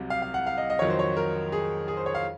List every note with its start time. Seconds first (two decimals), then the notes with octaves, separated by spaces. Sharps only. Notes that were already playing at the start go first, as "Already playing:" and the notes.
Already playing: C2 C3 F#3
0.10 F5
0.22 F5
0.34 F#5
0.47 F5
0.58 D#5
0.70 D#5
0.79 F2 D#3 F#3 C#5
0.90 C5
0.99 C#5
1.17 A#4
1.52 G#4
1.88 G#4
1.97 C5
2.06 C#5
2.15 F5